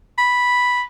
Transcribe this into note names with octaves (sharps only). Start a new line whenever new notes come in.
B5